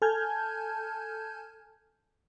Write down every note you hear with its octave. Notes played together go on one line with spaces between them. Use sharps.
A4 G#5 A5 F6 G6 G#6